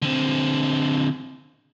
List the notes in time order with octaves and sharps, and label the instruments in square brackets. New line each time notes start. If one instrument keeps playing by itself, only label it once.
[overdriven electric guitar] D3 C4